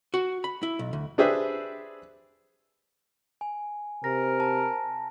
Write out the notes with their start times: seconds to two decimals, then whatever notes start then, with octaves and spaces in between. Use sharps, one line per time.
0.14 F#4
0.44 B5
0.63 E4
0.79 B1
0.93 D2
1.18 D4 G4 G#4 B4 C5 E5
3.41 G#5
4.04 C3 A#4 A#6
4.40 A5 A#5